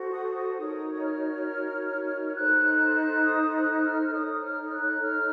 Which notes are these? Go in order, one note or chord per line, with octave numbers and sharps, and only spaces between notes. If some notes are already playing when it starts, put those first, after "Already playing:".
Already playing: F#4 A4 C5
D#6
D#6
D#4 F#4 A#4 C#5 D#6
F6
D#4 A4 C5 F#6
F#6
F#6
D#6
F#6
F6
D#4 A4 C#5 D#6
F6
F#6
F6